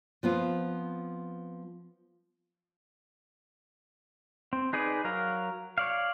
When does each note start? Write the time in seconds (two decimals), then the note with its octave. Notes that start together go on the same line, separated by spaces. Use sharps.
0.23 F3 B3 C4 F4
4.53 C4
4.73 D#4 G#4 B4 D5
5.05 F#3 A#4 F5
5.78 C#5 D5 F5